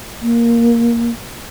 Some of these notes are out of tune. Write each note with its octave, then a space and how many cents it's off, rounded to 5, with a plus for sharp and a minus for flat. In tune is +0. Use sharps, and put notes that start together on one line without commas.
A#3 +5